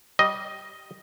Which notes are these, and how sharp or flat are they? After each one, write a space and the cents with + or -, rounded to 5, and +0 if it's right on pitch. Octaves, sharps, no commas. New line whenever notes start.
G3 -15 D#5 +0